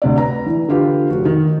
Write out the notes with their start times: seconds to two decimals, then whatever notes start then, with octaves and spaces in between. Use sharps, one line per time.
0.02 D2 C3 D5
0.17 B4 A#5
0.46 E3
0.68 D3 F4 G4 B4
1.10 F1 F#4
1.25 D#3